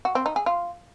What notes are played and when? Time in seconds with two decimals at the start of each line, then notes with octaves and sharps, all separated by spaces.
0.05 F#4
0.15 C4
0.26 D#4
0.36 G#4
0.46 F4